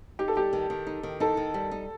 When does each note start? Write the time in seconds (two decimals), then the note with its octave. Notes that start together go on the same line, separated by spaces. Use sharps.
0.19 D#4 G4
0.28 A4
0.36 G3 G4
0.53 D#3
0.70 D#3
0.87 D#4
1.03 D#3
1.20 D#4 A4
1.37 D#3
1.54 G3
1.71 D#4